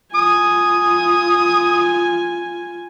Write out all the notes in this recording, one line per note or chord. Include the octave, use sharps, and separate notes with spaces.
F4 G#5 D#6